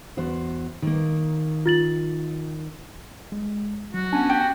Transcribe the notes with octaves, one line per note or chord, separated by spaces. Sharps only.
E2 F#4 C5
D#3 A#3
F4 A6 F#7
G#3
F#3 F#4
B3 C#4 D4 G#5 A5
G4